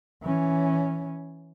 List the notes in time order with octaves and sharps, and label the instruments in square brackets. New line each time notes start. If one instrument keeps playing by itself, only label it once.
[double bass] E3 C#4